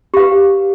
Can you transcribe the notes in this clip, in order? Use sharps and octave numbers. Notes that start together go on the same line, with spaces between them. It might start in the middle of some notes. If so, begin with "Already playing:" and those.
G4 B4 F5